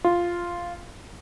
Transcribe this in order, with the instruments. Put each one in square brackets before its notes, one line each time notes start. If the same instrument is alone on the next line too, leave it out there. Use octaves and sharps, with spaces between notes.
[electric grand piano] F4